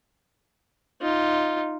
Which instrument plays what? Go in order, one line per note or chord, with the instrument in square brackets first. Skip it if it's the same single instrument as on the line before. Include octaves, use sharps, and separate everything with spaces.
[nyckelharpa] D#4 F4